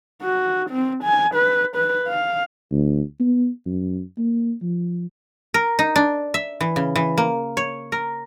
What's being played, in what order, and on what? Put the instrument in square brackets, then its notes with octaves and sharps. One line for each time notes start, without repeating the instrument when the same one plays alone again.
[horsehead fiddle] F#4
C4
G#5
B4
B4
F5
[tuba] D2
B3
F#2
A#3
F3
[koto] A#4
D#4
D4
E5
E3
C#3
E3
A#3
C#5
A#4